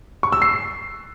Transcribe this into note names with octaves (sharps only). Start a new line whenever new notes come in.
C#6
E6
C7